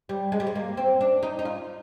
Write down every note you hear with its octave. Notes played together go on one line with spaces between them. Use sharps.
G3
G#3
G3
G#3
A#3
C4
D4
D#4
D#4
F4